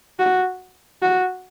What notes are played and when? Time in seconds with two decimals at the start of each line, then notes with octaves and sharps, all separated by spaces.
0.19 F#4
1.02 F#4